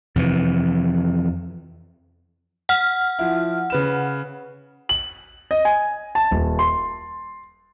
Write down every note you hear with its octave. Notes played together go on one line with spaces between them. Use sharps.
F2 C3 E3
F#5 F6
F3 E4
C#3 B4 E7
F#7
D#5
G#5
A5
D#1
C6